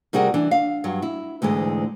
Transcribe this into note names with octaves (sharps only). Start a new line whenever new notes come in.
C3 G3 F#4 G#4 A#4
E3 D4
F5
G2 F#3
E4
D2 G#2 E3 G#3